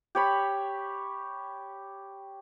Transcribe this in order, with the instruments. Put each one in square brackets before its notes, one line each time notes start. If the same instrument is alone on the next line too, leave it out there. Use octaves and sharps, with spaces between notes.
[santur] G4 C#5 B5